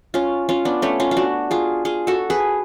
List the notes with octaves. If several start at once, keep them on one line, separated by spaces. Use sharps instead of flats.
C#4 F4
C#4 F4
B3 D4
A3 C#4
C#4 F4
F4
D4 F#4
F4 G#4
F4 G#4
F#4 A4
G#4 B4